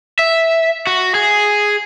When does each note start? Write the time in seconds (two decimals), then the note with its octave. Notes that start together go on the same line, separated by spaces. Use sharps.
0.19 E5
0.87 F#4
1.15 G#4